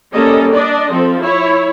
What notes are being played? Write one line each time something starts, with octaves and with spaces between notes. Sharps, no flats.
G3 A#3 C#4 A4 D#5
D4 D5 D#5
F3 C4 A4
E4 C#5